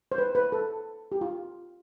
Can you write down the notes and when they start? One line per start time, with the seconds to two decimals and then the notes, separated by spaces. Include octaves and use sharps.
0.12 C5
0.18 B4
0.35 B4
0.52 A4
1.12 G4
1.21 F4